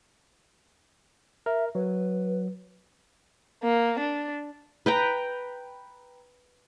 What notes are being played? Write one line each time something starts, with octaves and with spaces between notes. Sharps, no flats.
A#4 E5
F#3 B4
A#3
D4
B4 G5 A#5